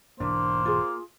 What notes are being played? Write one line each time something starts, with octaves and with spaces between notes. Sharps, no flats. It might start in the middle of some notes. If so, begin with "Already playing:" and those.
E1 G#2 E3 A#3 D4 C5
F4 G#4